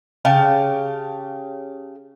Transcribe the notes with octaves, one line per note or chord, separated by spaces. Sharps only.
C#3 G4 F5 A5